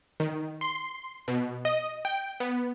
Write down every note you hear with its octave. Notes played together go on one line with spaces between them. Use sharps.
D#3
C6
B2
D#5
G5
B3